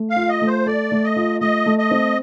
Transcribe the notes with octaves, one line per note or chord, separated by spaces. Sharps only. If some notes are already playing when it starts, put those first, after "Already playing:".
Already playing: A3
F5
F4
D#5
A3
C5
A4 D5
A3
D#5
F4
A3 D#5
A3
D#5
C4